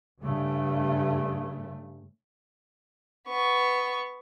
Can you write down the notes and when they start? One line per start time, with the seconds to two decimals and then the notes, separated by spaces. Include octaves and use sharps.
0.22 G2 C#3 A3
3.28 B3 C#6